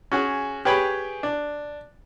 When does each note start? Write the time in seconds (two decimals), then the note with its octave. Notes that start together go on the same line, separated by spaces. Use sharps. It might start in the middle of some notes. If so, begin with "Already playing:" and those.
0.12 C#4 F#4 G#4
0.65 G4 G#4 B4 C#5 G5 B5
1.23 D4